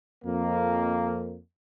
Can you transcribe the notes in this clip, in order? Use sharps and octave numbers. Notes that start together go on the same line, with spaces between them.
F2 A#3